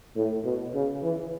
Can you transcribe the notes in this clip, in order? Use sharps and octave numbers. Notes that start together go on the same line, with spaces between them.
A2
B2
C#3
E3